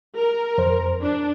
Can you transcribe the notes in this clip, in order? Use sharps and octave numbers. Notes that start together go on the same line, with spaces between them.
A#4
F2 C5
D4